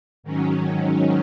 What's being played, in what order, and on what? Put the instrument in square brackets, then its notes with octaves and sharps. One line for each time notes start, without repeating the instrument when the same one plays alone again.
[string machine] G#2 D#3 F#3 C#4